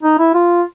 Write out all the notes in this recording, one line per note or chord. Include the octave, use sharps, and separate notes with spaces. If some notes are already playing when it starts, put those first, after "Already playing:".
D#4
E4
F4